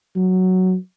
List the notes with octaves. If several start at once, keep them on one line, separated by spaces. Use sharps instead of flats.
F#3